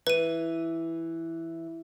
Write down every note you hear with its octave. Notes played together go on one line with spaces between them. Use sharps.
E3 B4 D#7